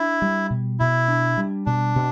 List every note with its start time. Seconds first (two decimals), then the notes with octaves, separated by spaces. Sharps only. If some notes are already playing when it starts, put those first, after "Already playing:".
Already playing: D4 E4
0.22 G3
0.50 B2
0.80 B2 E4
1.08 D4
1.37 G3
1.66 B2 D4
1.96 B2